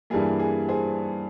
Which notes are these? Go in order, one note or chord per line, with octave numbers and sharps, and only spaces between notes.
G2 E3 G3 A#3 G#4
G#4
G#4 C5